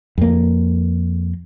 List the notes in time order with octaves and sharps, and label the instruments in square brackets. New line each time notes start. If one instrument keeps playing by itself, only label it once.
[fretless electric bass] F2 A#3